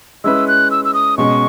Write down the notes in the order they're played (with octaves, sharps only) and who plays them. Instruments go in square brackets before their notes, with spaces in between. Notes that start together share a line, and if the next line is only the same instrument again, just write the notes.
[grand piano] G#3 C#4 E4 B4 [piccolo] E6
[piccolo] F#6
E6
E6
D#6
[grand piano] B2 G#3 C#4 [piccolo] C#6